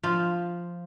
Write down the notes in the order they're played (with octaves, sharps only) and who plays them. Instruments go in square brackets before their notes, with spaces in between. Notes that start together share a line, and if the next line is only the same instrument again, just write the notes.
[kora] F3 [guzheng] F4